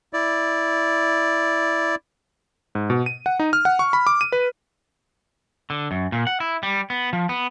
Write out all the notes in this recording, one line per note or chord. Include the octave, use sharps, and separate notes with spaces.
E4 D5
G#2
B2
D#7
F#5
D#4
F6
F#5
C#6
B5
D6
D#7
B4
D3
F#2
A#2
F#5
E4
G3
B3
F3
B3